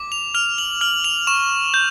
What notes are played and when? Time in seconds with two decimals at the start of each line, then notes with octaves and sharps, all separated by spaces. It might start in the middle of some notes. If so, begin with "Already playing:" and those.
Already playing: D6
0.12 F7
0.34 F6 F7
0.58 F#7
0.81 F6 F#7
1.04 F7
1.27 C#6 E7
1.74 G6